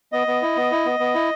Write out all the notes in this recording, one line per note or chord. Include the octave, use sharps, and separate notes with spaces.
B3 D#5
B3
E4
B3
E4
B3
B3
E4